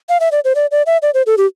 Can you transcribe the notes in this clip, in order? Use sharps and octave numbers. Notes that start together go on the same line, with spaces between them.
F5
E5
D5
C5
D5
D5
E5
D5
C5
A4
G4